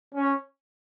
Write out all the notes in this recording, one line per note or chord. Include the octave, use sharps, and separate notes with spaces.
C#4